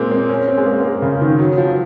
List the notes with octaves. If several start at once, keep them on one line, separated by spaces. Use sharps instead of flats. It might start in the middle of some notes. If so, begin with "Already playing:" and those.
Already playing: A#2 G#3 A#3 C4
C4
C#4
C4
G#3
A#3
A#3
G#3
C#3
D#3
F#3
F3